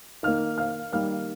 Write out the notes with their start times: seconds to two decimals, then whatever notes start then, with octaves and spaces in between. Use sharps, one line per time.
0.23 D#3 A#3 F5 F6
0.58 F5 F6
0.93 D#3 G3 A#3 F5 F6